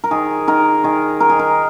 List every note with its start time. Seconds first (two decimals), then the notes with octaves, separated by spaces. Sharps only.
0.04 A#4
0.11 D#3 G#4
0.48 D#3 A#4
0.84 D#3 G#4
1.20 D#3 A#4
1.29 G#4
1.39 A#4